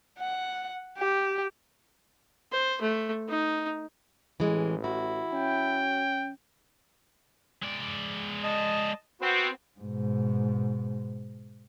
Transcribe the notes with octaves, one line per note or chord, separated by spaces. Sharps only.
F#5
G4
C5
A3
D#4
A1 E3 G#3
E4 F#4
C#4 G5
G#3 D5
D#5 A5
B3 C4 F#4
G#2 B2